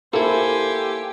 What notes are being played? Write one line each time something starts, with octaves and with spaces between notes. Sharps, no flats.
A#3 E4 G4 A4 C5 G#5